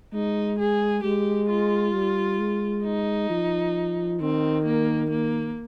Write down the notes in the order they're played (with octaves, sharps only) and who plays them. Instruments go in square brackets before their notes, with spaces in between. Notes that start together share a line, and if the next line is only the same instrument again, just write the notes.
[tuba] G#3 [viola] D#4
[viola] G#4
[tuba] G#3 [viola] G4
[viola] F4
[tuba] G3
G#3
[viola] D#4
[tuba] F3
[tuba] D#3 [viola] C4
[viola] A#3
A#3